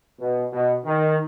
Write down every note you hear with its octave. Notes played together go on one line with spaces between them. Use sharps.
B2
B2
D#3